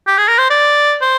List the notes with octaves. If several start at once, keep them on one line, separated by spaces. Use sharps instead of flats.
G4
G#4
A#4
C5
D5
C5